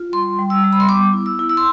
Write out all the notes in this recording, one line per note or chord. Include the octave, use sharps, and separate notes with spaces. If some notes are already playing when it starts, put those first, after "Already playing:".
Already playing: F4
G3 C6
G3
E6
G3
B5
C6
B3 D6
E4
E6
E4
E6
C6